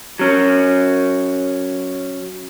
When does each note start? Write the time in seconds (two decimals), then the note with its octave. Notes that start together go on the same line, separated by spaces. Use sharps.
0.19 F#3 C#4